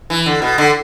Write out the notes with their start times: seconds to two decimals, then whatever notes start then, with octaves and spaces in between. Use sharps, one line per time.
0.10 E3
0.26 D3
0.42 B2
0.58 D3